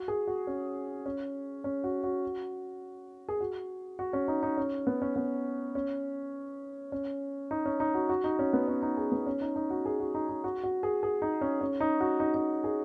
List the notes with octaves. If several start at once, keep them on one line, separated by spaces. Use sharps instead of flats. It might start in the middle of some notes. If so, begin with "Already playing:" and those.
Already playing: F#4
G#4
F#4
C#4
C#4
C#4
F#4
F#4
G#4
F#4
F#4
C#4
D#4
D#4
C#4
B3
C#4
B3
C#4
C#4
D#4
C#4
D#4
F#4
F#4
D#4
C#4
B3
C#4
D#4
G#4
B3
C#4
D#4
D#4
F#4
G#4
F#4
D#4
D#4
F#4
F#4
G#4
G#4
D#4
C#4
C#4
D#4
F#4
D#4
D#4
G#4